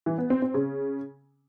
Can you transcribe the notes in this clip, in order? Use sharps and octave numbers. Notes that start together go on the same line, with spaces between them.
E3
B3
C4
C4
C#3